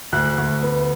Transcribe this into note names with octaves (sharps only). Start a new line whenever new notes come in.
D2 F#6
D2
B3